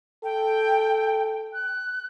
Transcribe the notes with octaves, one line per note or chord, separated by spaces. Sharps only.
A4 G5
F#6